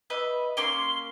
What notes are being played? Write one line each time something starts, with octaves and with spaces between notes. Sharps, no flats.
B4 D#5 E5
A#3 C#4 C6 G7